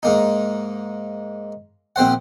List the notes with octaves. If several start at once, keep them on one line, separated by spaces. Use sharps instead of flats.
G#2 A#3 D#4
A#1 C4 C5 F#5